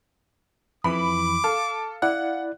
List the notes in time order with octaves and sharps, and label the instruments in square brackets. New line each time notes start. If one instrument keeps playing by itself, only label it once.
[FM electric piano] F2 E3 [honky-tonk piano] B5 [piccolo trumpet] D6
[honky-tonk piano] A4 [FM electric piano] F5
[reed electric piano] E4 D5 F#6 [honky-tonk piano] F#5